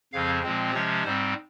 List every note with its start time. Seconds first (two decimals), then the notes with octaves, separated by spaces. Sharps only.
0.13 F2 C#3 F3 C4 F5
0.43 A#2 F3 G#3 C4
0.73 C3 F3 G#3 C#4 C#5
1.04 G#2 G3 C4 C5